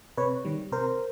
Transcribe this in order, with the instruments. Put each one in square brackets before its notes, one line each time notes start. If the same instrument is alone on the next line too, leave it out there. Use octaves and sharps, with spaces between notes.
[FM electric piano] C3 B4 C#5
D#3 G3
C3 A#4 C5